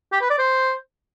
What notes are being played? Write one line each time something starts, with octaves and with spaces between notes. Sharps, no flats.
G4
B4
D5
C5